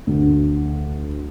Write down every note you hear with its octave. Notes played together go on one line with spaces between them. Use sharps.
D2